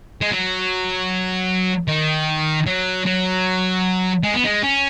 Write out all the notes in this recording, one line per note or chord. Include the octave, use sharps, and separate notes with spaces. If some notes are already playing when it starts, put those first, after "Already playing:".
G#3
F#3
D#3
F#3
F#3
G#3
B3
G#3
C#4